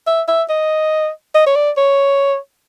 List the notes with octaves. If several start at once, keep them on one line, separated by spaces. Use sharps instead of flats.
E5
E5
D#5
D#5
C#5
D5
C#5